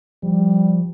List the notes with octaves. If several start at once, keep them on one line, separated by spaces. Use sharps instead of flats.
F3 G3